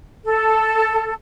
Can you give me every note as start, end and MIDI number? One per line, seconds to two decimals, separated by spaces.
0.25 1.12 69